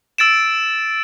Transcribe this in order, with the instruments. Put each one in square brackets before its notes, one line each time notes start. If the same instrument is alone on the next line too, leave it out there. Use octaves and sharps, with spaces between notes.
[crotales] E6 A6 D7 E7